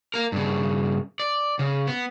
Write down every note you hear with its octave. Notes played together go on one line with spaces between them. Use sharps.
A#3 A#4
G2 C#3
D5
C#3
B3